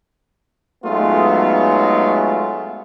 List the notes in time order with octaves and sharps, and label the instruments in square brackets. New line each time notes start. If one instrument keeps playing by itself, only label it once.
[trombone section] F#3 G#3 A3 B3 D#4 F4